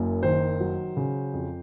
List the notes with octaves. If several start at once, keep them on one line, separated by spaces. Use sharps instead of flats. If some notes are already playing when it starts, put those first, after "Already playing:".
Already playing: F#1 F#2
D#3 C5
F#3
C#3
F2